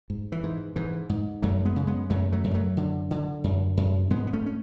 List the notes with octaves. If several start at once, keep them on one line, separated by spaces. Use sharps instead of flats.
G#2
E3
G#2
G#2 E3
G#2
F#2 F#3 A3
G#3 B3
C#3
G#3 B3
F#2 F#3 A3
F#3 A3
F#2
G#3
F#3 A3
D3
D3
F#2
F#2
G#2 G#3 B3
B3
A3 C#4
C#4